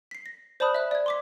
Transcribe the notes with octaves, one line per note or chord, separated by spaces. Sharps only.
B6 C7
A#6
C5 D5 A5 B5 D#6 F#6
E5 F#6
D5 G#6
C6 D6 B6